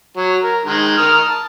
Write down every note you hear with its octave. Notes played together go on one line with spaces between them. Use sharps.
F#3
A#4
D#3 G#3
A#4 D#6 F6
A5